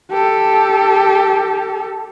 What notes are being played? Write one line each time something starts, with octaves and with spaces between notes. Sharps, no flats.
G4 A4